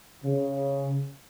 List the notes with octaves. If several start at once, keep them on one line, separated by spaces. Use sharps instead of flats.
C#3